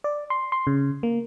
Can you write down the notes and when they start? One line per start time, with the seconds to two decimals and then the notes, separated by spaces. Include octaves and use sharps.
0.04 D5
0.30 C6
0.52 C6
0.67 C#3
1.03 A#3